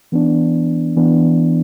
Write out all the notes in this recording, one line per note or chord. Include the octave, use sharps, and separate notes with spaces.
E3 B3 D4
E3 B3 D4